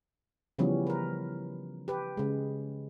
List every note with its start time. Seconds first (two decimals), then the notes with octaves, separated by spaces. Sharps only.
0.59 C#3 E3 F3 G3 B3 C#4
0.87 A#4 B4
1.88 G4 B4
2.17 C#3 G#3